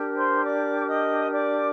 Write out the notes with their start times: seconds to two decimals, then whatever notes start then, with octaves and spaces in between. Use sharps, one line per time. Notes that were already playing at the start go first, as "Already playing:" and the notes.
Already playing: D4 G4 A#4
0.14 C5 C6
0.43 D5 D6
0.87 D#5 D#6
1.31 D5 D6